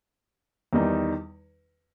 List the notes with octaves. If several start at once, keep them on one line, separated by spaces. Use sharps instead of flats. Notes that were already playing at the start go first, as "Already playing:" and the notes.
E2 D#3 G3 D#4